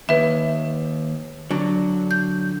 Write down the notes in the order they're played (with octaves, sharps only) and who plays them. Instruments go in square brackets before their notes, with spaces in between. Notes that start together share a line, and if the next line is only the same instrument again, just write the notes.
[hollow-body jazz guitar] D#2 [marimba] B4 E5
[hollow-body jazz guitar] D3 F#3
[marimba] G6